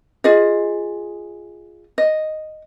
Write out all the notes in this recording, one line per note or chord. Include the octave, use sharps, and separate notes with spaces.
F4 G#4 D#5
D#5